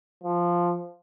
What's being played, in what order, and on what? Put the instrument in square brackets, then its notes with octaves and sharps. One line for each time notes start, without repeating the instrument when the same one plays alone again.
[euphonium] F3